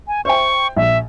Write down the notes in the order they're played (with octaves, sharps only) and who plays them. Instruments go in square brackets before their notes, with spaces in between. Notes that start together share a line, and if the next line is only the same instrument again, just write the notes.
[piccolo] G#5
[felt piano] C5 E5 G5 [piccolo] C#6
[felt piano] A#1 [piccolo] E5